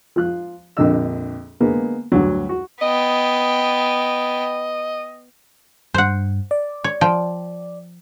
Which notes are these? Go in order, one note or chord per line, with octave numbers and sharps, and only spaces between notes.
F3 F4 F#6
A#1 F2 D3 D#5 E6
D3 G#3 A#3 B3
D2 G2 F#3
F#4
B3 D#5 G5
G2 C5 F#5
D5
C#5
F3 G5